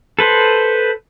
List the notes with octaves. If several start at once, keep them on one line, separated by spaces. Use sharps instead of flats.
A4 B4 C5